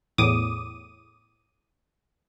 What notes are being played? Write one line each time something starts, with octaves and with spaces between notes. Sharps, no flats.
E2 A2 D6 D#6 D#7